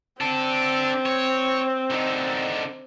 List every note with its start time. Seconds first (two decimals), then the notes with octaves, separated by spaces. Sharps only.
0.21 C4 D4 A4
1.06 C#5
1.90 D3 D#4